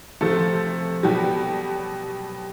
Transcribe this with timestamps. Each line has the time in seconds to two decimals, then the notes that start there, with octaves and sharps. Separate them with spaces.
0.21 C3 F3 A3 A4
1.03 B2 F#3 G3 G4